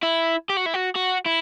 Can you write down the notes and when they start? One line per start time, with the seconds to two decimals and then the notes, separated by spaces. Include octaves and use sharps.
0.03 E4
0.50 G4
0.57 F#4
0.66 E4
0.74 F#4
0.95 F#4
1.26 E4